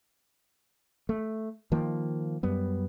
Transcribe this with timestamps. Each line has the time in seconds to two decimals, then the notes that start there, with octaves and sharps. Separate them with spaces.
1.09 A3
1.72 D#3 F3 A#3
2.43 F#2 G3 B3